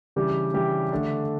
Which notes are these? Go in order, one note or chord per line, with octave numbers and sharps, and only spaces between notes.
C#3 E3 G3 D4 G4
C#3 E3 G3 D4 G4
D3 A3 D4